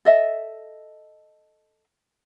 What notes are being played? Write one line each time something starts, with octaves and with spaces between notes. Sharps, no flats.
A4 D#5 E5